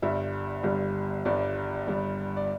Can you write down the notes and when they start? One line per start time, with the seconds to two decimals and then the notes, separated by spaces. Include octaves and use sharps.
0.02 G1 G2 G3 E5
0.63 G1 G2 G3
1.25 G1 G2 G3 D5
1.87 G1 G2 G3
2.37 D5